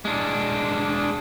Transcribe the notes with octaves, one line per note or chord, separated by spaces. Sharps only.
G#3 D4